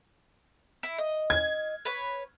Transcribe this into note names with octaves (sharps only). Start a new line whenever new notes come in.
E4
D#5
G#6
B4 C#5